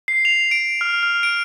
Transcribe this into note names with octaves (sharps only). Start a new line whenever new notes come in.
C7
F7
D7
F6
F6
D7